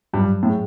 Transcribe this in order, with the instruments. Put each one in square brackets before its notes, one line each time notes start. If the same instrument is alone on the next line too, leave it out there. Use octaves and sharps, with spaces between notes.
[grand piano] G2 [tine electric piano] F#3
[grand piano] A2
[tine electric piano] G#4